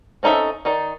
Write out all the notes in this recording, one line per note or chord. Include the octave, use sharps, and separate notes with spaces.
C4 C#4 D#4 A4 E5
D#3 D#4 D5